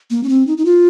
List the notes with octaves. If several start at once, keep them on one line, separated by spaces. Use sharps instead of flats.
A#3
C#4
C4
D#4
D#4
F4